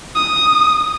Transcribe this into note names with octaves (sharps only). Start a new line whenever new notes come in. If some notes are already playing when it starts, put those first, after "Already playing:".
D#6